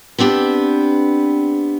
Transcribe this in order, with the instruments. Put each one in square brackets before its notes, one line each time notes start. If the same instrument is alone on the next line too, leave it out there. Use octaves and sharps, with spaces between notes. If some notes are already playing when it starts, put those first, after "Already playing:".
[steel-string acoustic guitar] B3 C4 D4 G4